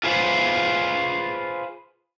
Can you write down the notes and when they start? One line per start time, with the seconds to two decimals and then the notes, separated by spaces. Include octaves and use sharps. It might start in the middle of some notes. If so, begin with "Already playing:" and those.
0.03 F4 G#4 B4 C5